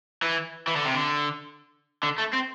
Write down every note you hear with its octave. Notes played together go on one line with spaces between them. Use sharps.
E3
E3
D3
C3
D3
D3
A3
C4